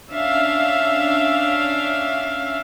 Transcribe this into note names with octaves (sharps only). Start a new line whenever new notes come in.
C#4 D4 E5 F5